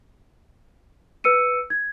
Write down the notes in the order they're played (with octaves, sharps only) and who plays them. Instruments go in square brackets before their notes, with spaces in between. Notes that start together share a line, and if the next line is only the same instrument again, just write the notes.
[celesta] B4 E6 C#7 D#7
G#6